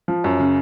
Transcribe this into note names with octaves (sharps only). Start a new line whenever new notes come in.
F3
F#2
C#3